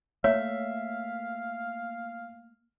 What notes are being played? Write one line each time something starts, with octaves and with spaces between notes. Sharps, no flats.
A3 A#3 C#5 E5 F5